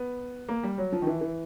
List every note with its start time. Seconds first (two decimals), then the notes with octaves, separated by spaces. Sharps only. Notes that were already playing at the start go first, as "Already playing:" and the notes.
Already playing: B3
0.49 A#3
0.63 G3
0.78 F#3
0.92 F3
1.02 D#3
1.07 E3
1.21 E3